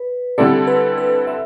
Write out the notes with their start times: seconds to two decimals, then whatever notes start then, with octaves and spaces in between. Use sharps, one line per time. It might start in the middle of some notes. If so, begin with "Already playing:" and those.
Already playing: B4
0.38 D3 G3 C4 E4 A4 D5
0.67 B4
0.98 B4
1.27 E5